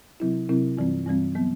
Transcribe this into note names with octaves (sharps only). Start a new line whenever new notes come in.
C3 F#3 C4 E4
C3 F#3 C4 E4
G2 E3 G3 C4
G2 E3 G3 C4
F#3 B3